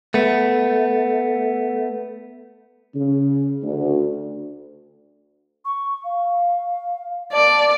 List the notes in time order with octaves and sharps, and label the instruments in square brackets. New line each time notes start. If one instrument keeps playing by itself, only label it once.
[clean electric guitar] A3 B3
[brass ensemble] C#3
D2
[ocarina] C#6
F5
[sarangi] D5 [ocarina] A5